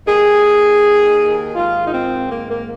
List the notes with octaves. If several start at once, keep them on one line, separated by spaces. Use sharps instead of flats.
D#2 D#3 G#4
G#2 D#3 F4
D#4
C4
A#3
A#3